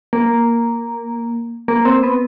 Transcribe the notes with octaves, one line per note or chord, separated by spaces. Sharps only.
A#3
A#3
C4
B3